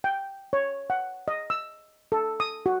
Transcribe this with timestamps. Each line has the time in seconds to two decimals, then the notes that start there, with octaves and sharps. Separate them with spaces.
0.04 G5
0.53 C#5
0.90 F#5
1.28 D#5
1.50 E6
2.12 A4
2.40 D#6
2.66 F#4